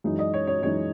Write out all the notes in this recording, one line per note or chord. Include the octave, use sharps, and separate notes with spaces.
F#2 E3 G#3 D#4
D#5
C#5
C#5
F#2 E3 G#3 D#4 C#5